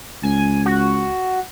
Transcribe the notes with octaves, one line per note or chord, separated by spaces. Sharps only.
C#2 G#5
F#4